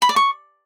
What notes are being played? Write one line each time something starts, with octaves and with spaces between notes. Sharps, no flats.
B5
D5
C#6